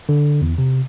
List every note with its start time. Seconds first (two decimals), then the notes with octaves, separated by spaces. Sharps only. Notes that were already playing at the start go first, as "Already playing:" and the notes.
0.09 D3
0.42 E2
0.58 C3